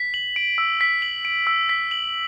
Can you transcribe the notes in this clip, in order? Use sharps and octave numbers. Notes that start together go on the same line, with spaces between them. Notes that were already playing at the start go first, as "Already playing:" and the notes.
Already playing: B6
F#7
D7
E6
B6
F#7
D7
E6
B6
F#7